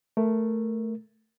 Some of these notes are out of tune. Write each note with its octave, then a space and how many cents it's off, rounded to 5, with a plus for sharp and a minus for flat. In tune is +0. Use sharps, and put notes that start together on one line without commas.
A3 +0 A#4 +0